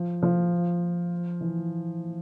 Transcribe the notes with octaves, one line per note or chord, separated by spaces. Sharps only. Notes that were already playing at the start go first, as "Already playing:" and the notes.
Already playing: F3
F3
E3